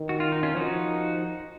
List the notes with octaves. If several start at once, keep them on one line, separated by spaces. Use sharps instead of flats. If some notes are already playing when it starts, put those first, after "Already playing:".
Already playing: D#3
F#4
F4
D#4
C#4 F4
F3 D#4 F#4